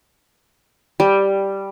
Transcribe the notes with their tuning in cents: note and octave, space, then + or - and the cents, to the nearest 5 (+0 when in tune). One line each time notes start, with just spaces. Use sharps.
G3 +0